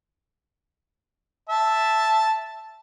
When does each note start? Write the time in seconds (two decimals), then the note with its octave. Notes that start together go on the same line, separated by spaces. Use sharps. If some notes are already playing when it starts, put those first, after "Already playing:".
1.49 E5 A5